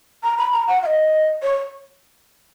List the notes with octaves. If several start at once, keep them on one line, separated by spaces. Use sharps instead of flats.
A#5
B5
A#5
F#5
F5
D#5
C#5